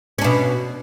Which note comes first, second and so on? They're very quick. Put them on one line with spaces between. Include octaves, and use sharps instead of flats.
C#4 D4 B2